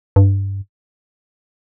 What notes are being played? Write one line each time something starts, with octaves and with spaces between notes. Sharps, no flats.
G2